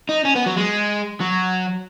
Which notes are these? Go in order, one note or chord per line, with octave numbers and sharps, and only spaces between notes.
D#4
C#4
B3
F#3
G#3
F#3